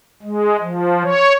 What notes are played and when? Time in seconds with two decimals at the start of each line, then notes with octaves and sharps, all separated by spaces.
0.23 G#3
0.61 F3
1.04 C#5